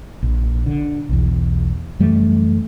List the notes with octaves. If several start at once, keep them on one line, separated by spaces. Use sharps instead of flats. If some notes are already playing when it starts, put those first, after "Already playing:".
A#1
D3
B1 E2
F#2 E3 G3 A3